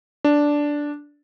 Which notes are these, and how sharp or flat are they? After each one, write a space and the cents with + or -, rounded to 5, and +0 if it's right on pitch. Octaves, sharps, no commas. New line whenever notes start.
D4 -5